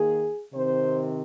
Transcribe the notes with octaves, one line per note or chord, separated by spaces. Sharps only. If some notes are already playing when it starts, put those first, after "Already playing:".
Already playing: D#3 A#3 G#4
C3 D#3 C4 C5